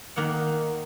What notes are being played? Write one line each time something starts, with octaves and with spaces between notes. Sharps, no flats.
D#3 A#3 D#4 F#5